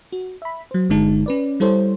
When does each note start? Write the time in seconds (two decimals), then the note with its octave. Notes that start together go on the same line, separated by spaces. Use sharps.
0.12 F#4
0.42 E5 B5
0.71 F#3 C5
0.89 G1 D3 G#3 D#4 A5
1.26 C#4 B4 D5
1.60 G3 E4 A4 C5 C#5